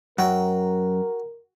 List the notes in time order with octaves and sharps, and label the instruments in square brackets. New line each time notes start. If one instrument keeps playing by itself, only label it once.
[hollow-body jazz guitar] F#2 [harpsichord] F#4 G5 [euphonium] A#4